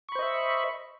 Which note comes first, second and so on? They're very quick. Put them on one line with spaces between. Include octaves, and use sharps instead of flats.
C#6 B5 C5 D#5 E5